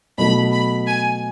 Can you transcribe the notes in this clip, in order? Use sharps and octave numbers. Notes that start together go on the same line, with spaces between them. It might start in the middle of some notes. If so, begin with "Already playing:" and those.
B2 F#3 A3 B5
B5
G#5